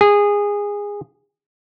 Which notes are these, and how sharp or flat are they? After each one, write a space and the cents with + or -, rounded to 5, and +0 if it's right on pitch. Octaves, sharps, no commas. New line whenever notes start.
G#4 -20